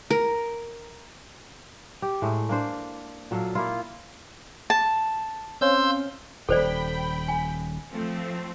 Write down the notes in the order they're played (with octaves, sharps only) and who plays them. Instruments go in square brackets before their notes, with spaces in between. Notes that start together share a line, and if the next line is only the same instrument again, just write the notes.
[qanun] A#4
[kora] G4
A2 G#3 A3
A#3 D4 C5
A#2 F#3 A4 F5
A#3 E4 F4
[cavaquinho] A5
[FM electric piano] C4 C#4 F5 [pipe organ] C6 E6 G6
[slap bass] D#1 [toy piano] A4 C5 D5 [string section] G5 B5
[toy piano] G#5
[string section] F3 A3 C4